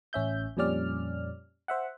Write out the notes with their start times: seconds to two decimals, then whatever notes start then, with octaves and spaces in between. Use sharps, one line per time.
0.13 A1 C#4 E5 G6
0.57 F2 A#2 G3 C#4 D5 F6
1.68 C5 E5 F#5